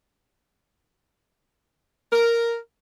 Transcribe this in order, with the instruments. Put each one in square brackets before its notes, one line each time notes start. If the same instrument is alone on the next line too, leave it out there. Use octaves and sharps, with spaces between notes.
[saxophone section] A#4